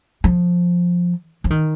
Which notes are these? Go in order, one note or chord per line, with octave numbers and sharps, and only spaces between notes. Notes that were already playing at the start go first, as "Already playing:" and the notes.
F3
F3
D#3